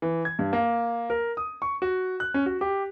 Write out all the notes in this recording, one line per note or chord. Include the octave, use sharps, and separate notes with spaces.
E3
G#6
G2
A#3
A#4
D#6
C#6
F#4
F#6
C#4
F#4
G4